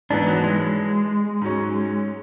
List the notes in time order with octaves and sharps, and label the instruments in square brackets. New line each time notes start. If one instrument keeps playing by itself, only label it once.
[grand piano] G#2 E3 B3 [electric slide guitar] D4
[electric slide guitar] F#3
G#3
G#3
[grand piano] G#2 F#3 C#4